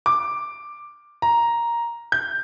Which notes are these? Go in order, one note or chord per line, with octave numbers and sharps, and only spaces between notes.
D6
A#5
G6